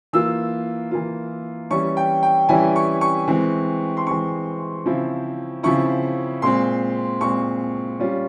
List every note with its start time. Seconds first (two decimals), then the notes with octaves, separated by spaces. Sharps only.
0.13 E3 A#3 F4 E6
0.91 E3 A#3 F4
1.71 E3 G3 C#4 E4 C#6
1.97 G5
2.23 G5
2.49 E3 G3 C#4 E4 G#5
2.76 C#6
3.01 C#6
3.28 E3 G#3 C4
3.97 C6
4.07 E3 G#3 C4 C#6
4.85 C#3 F3 C4 E4
5.63 C#3 F3 C4 E4 C#6
6.42 A#2 G#3 C4 C6
7.21 A#2 G#3 C4 C#6
8.00 G3 C#4 F4